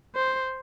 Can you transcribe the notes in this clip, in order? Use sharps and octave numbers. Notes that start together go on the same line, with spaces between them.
C5